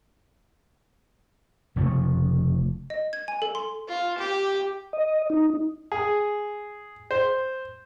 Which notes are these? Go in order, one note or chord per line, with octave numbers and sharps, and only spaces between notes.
F1 C#3 F3 A3
D#5
G#6
G#5
A4
C6
F4
G4
D#5
D#4
G#4
C5